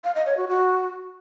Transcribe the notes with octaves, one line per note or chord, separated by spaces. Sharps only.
F5
D#5
C#5
F#4
F#4